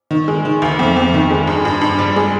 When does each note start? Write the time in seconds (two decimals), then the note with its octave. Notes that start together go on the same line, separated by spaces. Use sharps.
0.11 D#3
0.28 G#3
0.45 D#3
0.62 D2
0.79 F2
0.96 F2
1.14 D#3
1.30 G#3
1.47 G2
1.65 G2
1.81 G2
1.99 G3
2.16 G#3